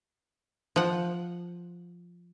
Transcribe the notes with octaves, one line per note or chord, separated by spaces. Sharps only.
F3 F#5